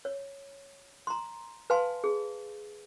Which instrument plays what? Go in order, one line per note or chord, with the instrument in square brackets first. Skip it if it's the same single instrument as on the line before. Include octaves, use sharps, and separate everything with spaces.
[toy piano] C#5
A#5 C6
B4 F5 G#5 A5 C6
G#4